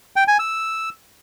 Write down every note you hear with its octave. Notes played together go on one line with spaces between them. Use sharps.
G5
G#5
E6